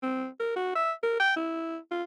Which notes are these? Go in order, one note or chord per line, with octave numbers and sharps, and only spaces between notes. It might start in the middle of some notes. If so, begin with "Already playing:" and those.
C4
A#4
F#4
E5
A#4
G5
E4
F4